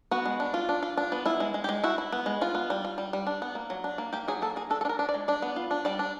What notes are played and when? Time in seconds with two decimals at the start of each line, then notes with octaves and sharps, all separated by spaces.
0.11 B3 F#4
0.25 G#3
0.40 D4
0.54 F4
0.69 D4
0.83 F4
0.97 D4
1.12 B3
1.25 E4 F4
1.40 G#3
1.54 G#3
1.64 G4
1.69 G#3
1.84 E4 F#4
1.98 E4
2.12 B3
2.26 G#3
2.41 B3 F4
2.55 B3
2.70 G3
2.85 F4
2.98 G3
3.13 G3
3.27 D4
3.42 B3
3.55 A#3
3.70 F#3
3.84 D4
3.98 A#3
4.13 A#3 G4
4.28 F#3 G#4
4.42 A#3 A4
4.56 A#3 G#4
4.70 D4 A4
4.81 A4
4.85 D4
4.89 A#4
4.99 D4
5.09 D5
5.14 G#3
5.28 D4 D5
5.42 B3
5.56 F4
5.71 D4
5.85 G3 D5
5.99 D4